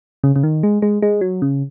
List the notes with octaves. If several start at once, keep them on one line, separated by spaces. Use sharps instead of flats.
C#3
C#3
D#3
G#3
G#3
G#3
F#3
C#3